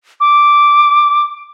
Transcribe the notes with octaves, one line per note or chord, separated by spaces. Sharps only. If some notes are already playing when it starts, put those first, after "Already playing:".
D6